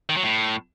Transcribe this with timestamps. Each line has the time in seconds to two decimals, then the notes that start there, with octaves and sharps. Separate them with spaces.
0.09 D#3
0.17 F#3
0.24 A2